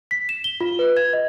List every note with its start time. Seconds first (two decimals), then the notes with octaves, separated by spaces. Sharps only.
0.11 B6
0.29 E7
0.44 G7
0.61 F4
0.79 B4
0.97 G#6
1.13 D#5